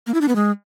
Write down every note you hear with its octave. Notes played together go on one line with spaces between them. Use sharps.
A#3
E4
D4
B3
G#3